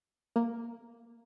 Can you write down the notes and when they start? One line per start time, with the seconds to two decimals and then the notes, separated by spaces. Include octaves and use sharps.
0.36 A#3